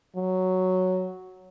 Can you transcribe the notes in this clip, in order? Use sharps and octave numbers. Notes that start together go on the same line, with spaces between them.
F#3